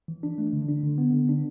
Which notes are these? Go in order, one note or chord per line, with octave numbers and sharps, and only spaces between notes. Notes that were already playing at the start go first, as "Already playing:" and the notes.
E3
D4
A3
D3
D4
D3
B3
D3
D4